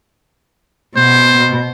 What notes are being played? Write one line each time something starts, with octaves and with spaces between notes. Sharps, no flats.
B2 C5